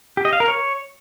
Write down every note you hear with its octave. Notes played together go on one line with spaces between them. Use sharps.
G4
D#5
F5
A#4
C#5